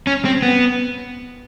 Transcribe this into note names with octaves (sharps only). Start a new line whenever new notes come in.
C#4
C4
B3